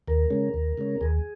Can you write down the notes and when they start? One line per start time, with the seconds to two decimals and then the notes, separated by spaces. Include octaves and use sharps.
0.08 D#2 A#4
0.30 C#3 G#3 C#4
0.54 D#2
0.77 C#3 G#3 C#4
1.01 D#2 G#4